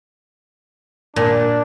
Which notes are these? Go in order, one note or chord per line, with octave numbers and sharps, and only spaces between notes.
A#2 D4